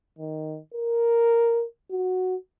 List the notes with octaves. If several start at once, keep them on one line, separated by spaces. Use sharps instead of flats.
D#3
A#4
F#4